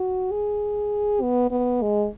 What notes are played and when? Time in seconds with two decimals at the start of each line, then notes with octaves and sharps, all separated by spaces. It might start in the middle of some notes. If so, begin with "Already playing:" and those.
Already playing: F#4
0.32 G#4
1.22 B3
1.51 B3
1.82 G#3